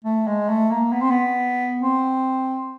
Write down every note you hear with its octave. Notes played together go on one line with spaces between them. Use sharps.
A3
G#3
A3
A#3
B3
C4
B3
C4